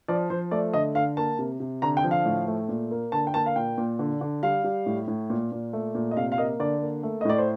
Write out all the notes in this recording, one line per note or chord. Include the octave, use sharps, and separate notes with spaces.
F3 D5
F3 C5
A3 D5
D3 D#5
D3 F5
A#3 A5
C3
C3
D3 A#5
G5
F3
F5
A2
A3
A#2
A#3
D3 A5
G5
A#3 A5
F5
A#2 G5
A#2
D3
D3
G3 F5
G3
A2
A2
A#2
A#2
A3
A#2
D#5
C3 F5
F5
A#3 D#5
D3 D5
A#3
A3
D#5
A2 D5
C5